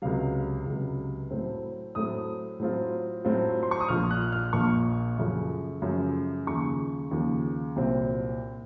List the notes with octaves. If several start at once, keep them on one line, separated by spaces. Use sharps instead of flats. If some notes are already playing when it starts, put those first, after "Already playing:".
C#2 C3 F#3 F5
C#2 C3 F#3
A2 F#3 A3 C4
A2 F#3 A3 C4 D#6
A2 F#3 C4 F4
A2 F#3 C4 F4
C6
C#6
D#6
A#1 A#2 F3 F6
F#6
F6
A#1 A#2 F3 C#6
F#2 C#3 F3 A3
F#2 C#3 F3 A3
D#2 C#3 F3 C#6
D#2 C#3 F3
C2 A#2 F#3 C4